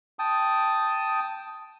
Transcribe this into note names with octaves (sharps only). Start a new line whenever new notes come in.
G5 A5 D#6